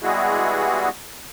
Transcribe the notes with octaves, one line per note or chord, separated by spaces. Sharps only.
G3 G#3 B3 E4 F#4 G#4